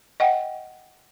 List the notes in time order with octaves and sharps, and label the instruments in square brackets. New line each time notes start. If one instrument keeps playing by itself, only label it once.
[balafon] D#5 F#5 G5